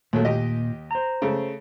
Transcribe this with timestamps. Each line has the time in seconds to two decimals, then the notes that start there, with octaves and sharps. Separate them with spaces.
0.13 D#2 A#2 F#3 A3
0.25 D#2 G4 D#5
0.91 C5 A#5
1.22 C#3 A3